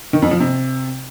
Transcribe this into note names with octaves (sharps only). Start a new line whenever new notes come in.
D#3
F2
F3
C3